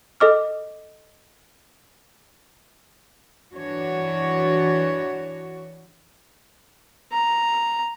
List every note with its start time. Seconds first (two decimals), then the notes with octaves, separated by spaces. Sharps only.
0.20 A4 D#5 D6 F6
3.55 E3 D4 F#4 C#5
7.12 A#5